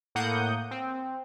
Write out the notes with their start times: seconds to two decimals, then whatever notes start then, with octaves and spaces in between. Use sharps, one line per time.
0.15 A2 A#3 F#5 D#6 G6
0.71 C4